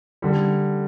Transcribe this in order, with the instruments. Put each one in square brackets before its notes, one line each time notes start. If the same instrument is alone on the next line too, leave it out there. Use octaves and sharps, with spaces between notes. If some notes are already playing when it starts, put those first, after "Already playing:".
[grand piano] D3 G3